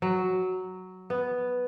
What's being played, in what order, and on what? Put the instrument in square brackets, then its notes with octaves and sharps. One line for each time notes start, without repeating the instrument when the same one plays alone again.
[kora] F#3
B3